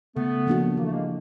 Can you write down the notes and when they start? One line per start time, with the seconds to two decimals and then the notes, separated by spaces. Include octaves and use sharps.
0.16 C#3 A3 B3
0.47 F3 A#3 D4 F#4
0.77 E3 A#3
0.85 A3
0.92 G#3 A#3